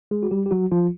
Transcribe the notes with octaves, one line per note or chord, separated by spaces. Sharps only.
G#3 G#4
F#4
G3 G4
G4
F#3 F#4
F3 F4